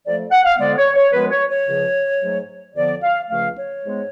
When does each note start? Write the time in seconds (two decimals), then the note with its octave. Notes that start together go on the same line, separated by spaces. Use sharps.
0.04 F2 F3 A3 D5
0.32 F#5
0.45 F5
0.58 F2 D3 G#3 B3 D5
0.77 C#5
0.95 C#5
1.12 F#2 F3 G#3 B3 B4
1.31 C#5
1.49 C#5
1.66 C#2 C#3 F3
2.20 G#2 F#3 A3
2.74 F2 D3 F3 B3 D5
3.02 F5
3.28 C#2 C#3 F3 A3 F5
3.55 C#5
3.83 G#2 G#3 B3